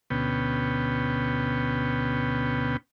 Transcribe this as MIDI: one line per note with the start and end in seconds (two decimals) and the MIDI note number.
0.10 2.77 38
0.10 2.77 47
0.10 2.77 59
0.10 2.77 61
0.10 2.77 79